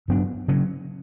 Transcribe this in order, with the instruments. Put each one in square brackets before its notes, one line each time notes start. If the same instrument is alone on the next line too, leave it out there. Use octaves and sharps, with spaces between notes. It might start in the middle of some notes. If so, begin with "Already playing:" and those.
[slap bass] G2 F#3 B3 D4
C#3 F#3 C#4